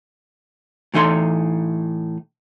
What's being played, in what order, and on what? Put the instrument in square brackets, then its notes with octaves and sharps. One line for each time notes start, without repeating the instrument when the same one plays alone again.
[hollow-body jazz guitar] A2 E3 D#4 A4 C6